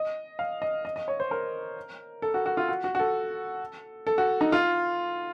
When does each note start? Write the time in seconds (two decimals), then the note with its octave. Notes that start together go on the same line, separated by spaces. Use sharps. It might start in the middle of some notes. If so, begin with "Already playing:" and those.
Already playing: D#5
0.39 F5
0.62 D#5
0.85 D#5
0.96 D#5
1.08 C#5
1.20 C5
1.31 A#4
2.22 A4
2.34 F#4
2.46 F#4
2.57 F4
2.69 F#4
2.84 F#4
2.95 F#4
2.99 A4
4.07 A4
4.18 F#4
4.41 D#4
4.52 F4